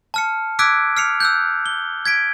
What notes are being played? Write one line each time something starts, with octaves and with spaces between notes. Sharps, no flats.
A5 F6 C#7
D6 E6 F#6 G#6 B6 D7
F6 C7 C#7 F7
E6 F#6 G6
G7
G#6 B6 D7